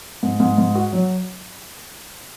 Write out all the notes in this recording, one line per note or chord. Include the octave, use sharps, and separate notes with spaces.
G#2
G#2
G#2
F#4
F#3